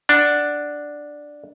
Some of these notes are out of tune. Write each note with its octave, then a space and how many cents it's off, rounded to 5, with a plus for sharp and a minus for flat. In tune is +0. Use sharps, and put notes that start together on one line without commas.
D4 +0 F#5 +0